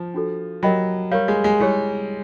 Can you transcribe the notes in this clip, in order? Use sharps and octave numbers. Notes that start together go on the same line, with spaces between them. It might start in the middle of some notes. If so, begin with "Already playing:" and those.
Already playing: F3
D4 F#4 A4
F#3 G4 A#4 D#5 G5 B5
G3 G4 A#4 C#5 F5
G#3
G#3
G3 E4 G#4 C#5